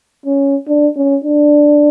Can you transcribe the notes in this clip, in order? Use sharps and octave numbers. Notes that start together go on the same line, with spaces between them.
C#4
D4
C#4
D4